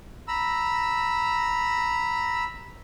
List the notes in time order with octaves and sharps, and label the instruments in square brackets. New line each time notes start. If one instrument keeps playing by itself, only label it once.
[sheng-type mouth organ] A#5 B5 E6